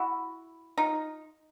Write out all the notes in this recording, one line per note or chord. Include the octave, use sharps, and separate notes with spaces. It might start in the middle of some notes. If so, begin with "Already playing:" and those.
Already playing: E4 F#4
D#4 F4